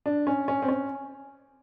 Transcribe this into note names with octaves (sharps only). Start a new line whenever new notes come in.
D4
C#4
C#4
C4
C#4